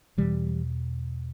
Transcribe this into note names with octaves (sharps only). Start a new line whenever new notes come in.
E2 B2 E3 G3